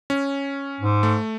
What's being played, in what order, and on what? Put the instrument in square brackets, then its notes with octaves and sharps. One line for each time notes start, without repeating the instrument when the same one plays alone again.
[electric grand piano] C#4
[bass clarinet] G#2
[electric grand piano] A3